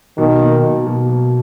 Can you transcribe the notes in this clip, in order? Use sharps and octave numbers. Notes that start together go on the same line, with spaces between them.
B2 D#3
A#3
B2
B2
B2